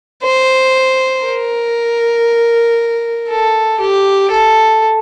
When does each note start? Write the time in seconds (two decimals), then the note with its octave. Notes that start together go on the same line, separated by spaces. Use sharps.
0.23 C5
1.25 A#4
3.29 A4
3.80 G4
4.31 A4